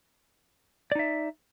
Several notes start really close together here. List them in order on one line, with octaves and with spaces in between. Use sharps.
D5 D#4 E5